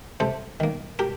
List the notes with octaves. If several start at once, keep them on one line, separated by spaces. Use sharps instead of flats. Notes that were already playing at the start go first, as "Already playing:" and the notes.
C3 A4 C5
D#3 A#3
G4 A#4